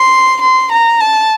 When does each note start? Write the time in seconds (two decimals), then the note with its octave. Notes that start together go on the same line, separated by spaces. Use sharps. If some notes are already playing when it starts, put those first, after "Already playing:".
Already playing: C6
0.42 C6
0.72 A#5
1.00 A5